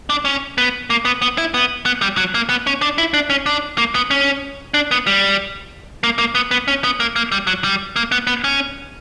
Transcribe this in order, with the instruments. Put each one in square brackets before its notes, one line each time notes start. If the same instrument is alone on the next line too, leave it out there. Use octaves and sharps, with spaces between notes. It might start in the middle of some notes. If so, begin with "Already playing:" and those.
[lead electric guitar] D4
C#4
B3
A#3
B3
B3
E4
B3
B3
G3
F#3
A#3
B3
C#4
D4
E4
D4
C#4
D4
A#3
B3
C#4
D4
B3
G3
A#3
A#3
B3
B3
C#4
B3
A#3
A#3
G3
F#3
G3
A#3
B3
B3
C#4